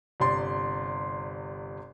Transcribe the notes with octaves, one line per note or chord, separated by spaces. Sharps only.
G1 C3 D5 C6